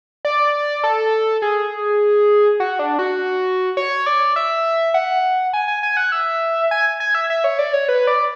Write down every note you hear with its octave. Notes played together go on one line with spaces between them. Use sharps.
D5
A4
G#4
F#4
D4
F#4
C#5
D5
E5
F#5
G#5
G#5
G#5
F#5
E5
G#5
G#5
E5
E5
C#5
D5
C#5
B4
D5